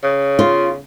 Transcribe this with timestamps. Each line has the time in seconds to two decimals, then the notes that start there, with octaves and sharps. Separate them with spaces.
0.03 C#3
0.39 F4